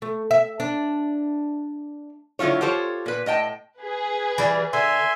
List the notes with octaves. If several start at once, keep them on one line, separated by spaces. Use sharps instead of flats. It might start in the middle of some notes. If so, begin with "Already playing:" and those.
A3
E5
D4
D3 F#3 E4 F4 C#5
F4 G4 A4 C5 C#5
A#2 B4
A2 D#5 G5 A5
G#4 B4
E3 G3
D3 E5 G#5 C6